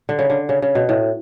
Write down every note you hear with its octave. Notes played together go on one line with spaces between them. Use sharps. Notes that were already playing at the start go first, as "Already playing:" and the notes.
D3
C#3
D3
C#3
C#3
B2
A2